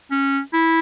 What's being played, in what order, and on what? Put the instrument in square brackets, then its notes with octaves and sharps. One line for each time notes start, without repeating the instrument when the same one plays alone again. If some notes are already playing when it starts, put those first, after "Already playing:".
[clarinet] C#4
E4